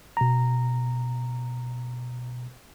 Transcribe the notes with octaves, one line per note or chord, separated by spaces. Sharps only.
B2 A#5